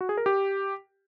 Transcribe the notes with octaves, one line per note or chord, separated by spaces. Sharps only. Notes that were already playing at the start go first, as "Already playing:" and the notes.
F#4
G#4
A#4
G4